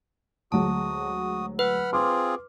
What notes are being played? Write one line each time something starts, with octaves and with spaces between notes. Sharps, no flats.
D2 F#3 G#3 F#4 A5 D#6
B4 F#5 B5 F6
C4 F4 G#4 C6 D6 F6